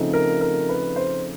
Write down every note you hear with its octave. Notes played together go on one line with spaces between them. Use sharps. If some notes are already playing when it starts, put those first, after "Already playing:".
Already playing: C#3 F3 A3 C4 D#4
A#4
A#4
B4
C5